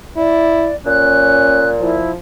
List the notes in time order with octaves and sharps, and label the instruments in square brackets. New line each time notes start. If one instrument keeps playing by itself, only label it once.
[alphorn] E4 [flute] D5
[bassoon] A#2 [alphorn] C#4 [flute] F#6
[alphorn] F3 [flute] E4